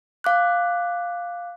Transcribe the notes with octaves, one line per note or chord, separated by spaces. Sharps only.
F5 D6 F#6